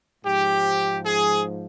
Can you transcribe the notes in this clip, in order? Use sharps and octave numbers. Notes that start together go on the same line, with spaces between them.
G#2 F3 G4
G#4